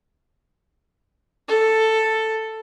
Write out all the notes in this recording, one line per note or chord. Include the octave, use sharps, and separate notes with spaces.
A4